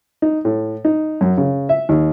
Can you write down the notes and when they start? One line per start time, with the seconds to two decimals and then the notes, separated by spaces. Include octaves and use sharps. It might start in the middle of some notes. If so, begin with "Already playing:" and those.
0.22 D#4
0.45 A2
0.85 D#4
1.21 F#2
1.38 C#3
1.69 E5
1.89 D#2